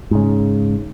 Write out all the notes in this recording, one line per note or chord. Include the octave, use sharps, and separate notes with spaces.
G#2 C#3